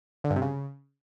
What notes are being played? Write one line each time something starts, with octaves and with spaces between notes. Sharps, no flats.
D3
G2
C3
C#3